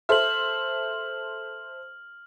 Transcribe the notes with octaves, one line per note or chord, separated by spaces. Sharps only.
A4 C5 E5 F6 F#7